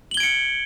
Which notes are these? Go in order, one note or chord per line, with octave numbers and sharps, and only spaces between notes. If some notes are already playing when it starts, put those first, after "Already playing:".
G#6 C#7 D7 F#7 G7